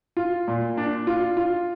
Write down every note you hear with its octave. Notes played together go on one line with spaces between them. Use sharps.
F4
A#2
D4
F4
F4